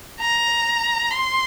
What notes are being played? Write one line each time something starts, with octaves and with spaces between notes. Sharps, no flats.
A#5
C6